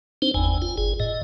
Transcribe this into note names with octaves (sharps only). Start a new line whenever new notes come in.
C4 D4 D#4 C5
G1 E2 G#5
F4
G1 G#4
A2 D#5